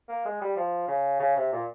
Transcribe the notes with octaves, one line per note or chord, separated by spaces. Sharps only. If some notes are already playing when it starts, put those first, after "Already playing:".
A#3
G#3
G3
F3
C#3
C#3
C3
A#2